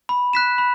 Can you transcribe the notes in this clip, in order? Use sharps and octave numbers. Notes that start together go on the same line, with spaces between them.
B5
F#6 B6 E7
B5